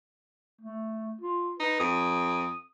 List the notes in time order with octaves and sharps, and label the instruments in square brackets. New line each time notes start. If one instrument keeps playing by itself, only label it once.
[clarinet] A3
F4
[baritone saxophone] D#4 [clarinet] B4
[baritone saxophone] F2 [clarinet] D#6